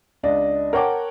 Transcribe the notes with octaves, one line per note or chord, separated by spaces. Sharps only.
C#2 D4 D#5
A#4 C#5 F#5 G5 A5 D6